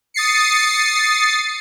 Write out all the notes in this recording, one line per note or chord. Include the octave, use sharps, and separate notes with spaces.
D#6 A6 C7 C#7